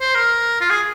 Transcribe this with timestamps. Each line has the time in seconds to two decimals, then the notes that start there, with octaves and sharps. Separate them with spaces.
0.01 C5
0.15 A#4
0.61 F4
0.70 G#4